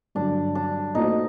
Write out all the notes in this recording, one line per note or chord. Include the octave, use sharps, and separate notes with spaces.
G2 D3 F#3 D4
D4
A#2 A3 C4 D#4 F#4 C5